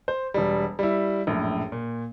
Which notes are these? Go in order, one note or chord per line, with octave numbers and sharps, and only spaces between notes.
C5
E1 G3
G3 E4
A#1 F#2 A2
A#2